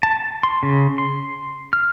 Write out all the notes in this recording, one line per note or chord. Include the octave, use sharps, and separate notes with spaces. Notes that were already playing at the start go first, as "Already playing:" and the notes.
A5
C6
C#3
C6
F6